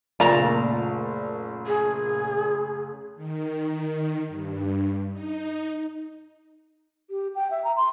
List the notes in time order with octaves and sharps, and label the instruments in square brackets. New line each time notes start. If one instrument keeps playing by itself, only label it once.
[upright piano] F#1 A3 [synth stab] A#2 [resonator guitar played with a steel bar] A5 A#5
[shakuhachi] G#4
[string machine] D#3
G2
D#4
[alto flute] G4
G5
E5
A#5
C6